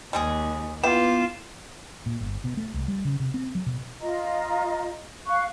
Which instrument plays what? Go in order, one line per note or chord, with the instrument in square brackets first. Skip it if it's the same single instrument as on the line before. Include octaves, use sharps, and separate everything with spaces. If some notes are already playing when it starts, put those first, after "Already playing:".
[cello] D#2 [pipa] G3 G#3 G#4
[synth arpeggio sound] B3 E4 [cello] F4 [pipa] G4 [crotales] E7
[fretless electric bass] A#2
G1
B2
A3
C2
G3
C#3
C3
C4
F#3
B2
[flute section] F4 D#5 A#5
F5 C#6 F#6